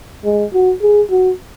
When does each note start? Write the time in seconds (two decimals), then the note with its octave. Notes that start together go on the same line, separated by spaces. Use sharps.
0.24 G#3
0.53 F#4
0.82 G#4
1.11 F#4